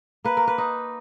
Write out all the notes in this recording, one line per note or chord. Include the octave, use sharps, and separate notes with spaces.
A#3 B4
A#4
B4
D#4